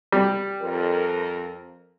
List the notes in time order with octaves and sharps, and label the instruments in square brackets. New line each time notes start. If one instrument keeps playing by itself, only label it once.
[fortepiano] G3
[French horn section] F2 A#4